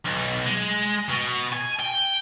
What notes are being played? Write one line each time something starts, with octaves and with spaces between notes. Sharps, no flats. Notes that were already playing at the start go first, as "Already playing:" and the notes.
B1
G#3
B2
G#5
G5